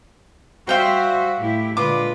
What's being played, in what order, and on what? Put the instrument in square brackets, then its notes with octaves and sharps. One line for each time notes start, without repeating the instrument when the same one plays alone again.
[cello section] G3 C5 E5 [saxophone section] F#4 [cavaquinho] F5 G5 C6
[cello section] A2 E4 G4
[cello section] A#2 D3 G#3 [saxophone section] F4 B4 [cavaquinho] D6